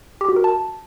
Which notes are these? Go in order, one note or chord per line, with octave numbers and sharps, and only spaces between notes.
G4
F#4
A#4
A5